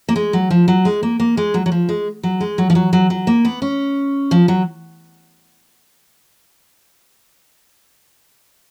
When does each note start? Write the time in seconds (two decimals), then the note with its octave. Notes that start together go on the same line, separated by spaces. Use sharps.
0.09 A#3
0.16 G#3
0.33 F#3
0.51 F3
0.68 F#3
0.85 G#3
1.03 A#3
1.20 A#3
1.37 G#3
1.54 F#3
1.66 F#3
1.72 F3
1.89 G#3
2.23 F#3
2.41 G#3
2.58 F#3
2.70 F3
2.75 F#3
2.93 F#3
3.10 F#3
3.27 A#3
3.45 B3
3.62 C#4
4.31 F3
4.48 F#3